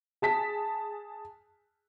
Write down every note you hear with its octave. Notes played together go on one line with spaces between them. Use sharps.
G#4 A5 B6